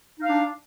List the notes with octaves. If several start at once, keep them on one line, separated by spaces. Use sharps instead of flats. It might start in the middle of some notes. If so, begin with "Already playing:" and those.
D4 D#4 F5